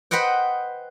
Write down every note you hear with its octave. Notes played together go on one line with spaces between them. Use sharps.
B4 C5 D#5 F#5 G5